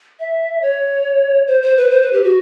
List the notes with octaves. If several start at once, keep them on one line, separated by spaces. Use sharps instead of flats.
E5
C#5
C5
C5
B4
C5
B4
G4
F#4